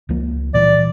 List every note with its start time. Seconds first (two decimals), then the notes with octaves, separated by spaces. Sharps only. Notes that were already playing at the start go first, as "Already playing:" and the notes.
0.09 C#2 F3 A#3
0.54 A#2 E3 G3 D5